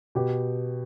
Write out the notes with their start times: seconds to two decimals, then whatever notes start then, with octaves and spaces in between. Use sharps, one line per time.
0.15 B2 G4